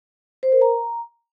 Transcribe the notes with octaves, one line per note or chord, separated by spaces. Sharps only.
C5
A#4
A#5